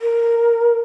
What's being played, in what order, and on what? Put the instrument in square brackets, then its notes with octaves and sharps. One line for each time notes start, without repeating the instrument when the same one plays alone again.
[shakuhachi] A#4